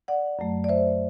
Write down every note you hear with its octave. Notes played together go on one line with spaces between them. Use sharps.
D5 F#5
F#2 F#3 A3
D5
C5 E5